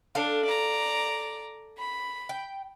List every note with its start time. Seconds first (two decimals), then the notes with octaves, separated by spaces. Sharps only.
0.15 D4 A4 F5
0.47 D5 A#5
1.77 B5
2.29 G5